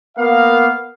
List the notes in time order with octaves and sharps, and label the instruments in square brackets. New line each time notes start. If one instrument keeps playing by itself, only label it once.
[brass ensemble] A#3 B3 F5